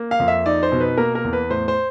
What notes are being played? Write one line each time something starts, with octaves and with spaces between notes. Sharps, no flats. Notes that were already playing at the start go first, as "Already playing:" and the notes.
Already playing: A#3
F5
F2
E5
D#4 D5
C5
B2
B4
A#3 A#4
A#4
E2
B4
A2 C5
C5